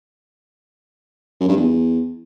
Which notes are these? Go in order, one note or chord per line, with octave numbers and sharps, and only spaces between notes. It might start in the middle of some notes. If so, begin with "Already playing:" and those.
F#2
G2
E2